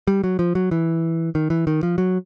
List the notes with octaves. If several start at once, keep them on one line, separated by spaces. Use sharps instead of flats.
G3
F#3
F3
F#3
E3
D#3
E3
D#3
F3
F#3